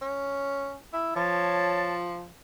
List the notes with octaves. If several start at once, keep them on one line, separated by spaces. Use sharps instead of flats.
C#4
E4
F3 C#5 A5